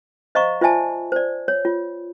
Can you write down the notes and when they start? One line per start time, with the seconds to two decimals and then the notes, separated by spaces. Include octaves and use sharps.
0.35 C5 D#5 F5 A#5 C#6
0.61 F4 C5 D5 E5 G#5 A5
1.12 C5 D5
1.48 C#5
1.65 F4